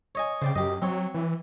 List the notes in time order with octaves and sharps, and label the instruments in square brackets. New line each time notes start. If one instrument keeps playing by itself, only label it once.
[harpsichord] C#5 D#5 G#5
[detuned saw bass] C#3 [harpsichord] C5 D5 G5
[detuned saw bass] F#2 [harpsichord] G4 D#5
[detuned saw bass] F#3 [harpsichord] C4 C#5
[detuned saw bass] E3